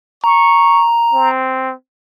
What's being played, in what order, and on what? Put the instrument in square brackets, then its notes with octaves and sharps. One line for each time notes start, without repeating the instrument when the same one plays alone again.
[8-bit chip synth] A#5 [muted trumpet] C#6
[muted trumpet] C4